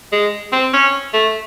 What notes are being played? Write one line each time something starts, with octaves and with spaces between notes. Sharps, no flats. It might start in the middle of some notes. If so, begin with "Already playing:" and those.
G#3
C4
C#4
A3